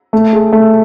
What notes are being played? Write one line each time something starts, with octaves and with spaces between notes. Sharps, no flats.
A3
G#4
A3